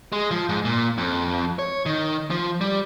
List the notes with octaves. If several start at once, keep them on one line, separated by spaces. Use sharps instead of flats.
G#3
F3
G#2
A#2
F2
C#5
D#3
F3
G3